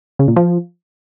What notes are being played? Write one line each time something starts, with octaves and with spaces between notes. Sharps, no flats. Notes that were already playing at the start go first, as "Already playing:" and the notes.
C#3
A#2
F3